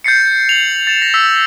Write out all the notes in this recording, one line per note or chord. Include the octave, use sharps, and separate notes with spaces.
G6 A6 C7 C#7
F7 F#7
A6 E7
A#6
E6 B6